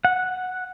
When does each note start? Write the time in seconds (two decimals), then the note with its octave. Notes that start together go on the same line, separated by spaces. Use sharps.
0.05 F#5